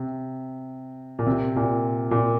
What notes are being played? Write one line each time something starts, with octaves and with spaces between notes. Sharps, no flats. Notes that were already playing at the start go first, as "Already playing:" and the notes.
Already playing: C3
A#2
C3
A#2
A#2